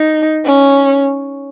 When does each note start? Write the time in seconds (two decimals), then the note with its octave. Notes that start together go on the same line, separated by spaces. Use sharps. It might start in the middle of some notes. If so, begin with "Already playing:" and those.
Already playing: D#4
0.46 C#4